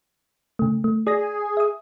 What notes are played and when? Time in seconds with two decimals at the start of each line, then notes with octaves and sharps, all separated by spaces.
0.59 C#3 A3
0.84 A3
1.07 G#4 D5 D#6 A#6
1.57 E5 D#6